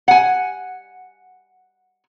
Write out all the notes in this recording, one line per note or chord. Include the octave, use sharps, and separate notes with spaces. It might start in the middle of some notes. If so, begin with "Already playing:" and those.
F#5 G#5